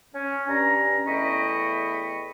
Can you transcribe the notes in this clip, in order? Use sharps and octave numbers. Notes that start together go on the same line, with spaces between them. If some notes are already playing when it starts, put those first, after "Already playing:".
C#4
G2 C#4 A#5
E2 A3 D#5 G5 B5 C#6